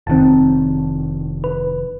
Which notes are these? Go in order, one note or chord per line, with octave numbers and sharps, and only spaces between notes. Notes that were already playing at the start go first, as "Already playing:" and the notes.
F1 D#3 C4 A5
B4